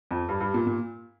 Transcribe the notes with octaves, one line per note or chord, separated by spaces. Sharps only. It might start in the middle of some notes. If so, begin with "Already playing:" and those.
F2
G2
G2
A#2
A#2